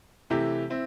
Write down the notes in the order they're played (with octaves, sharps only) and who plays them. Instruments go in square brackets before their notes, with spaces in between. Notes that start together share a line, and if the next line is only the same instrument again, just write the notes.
[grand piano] C3 E3 A3 E4 G4
C4 E4